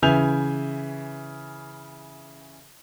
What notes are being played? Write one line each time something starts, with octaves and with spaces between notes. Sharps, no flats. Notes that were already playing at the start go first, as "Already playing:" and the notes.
C#3 E3 E5 G#5 G6 F7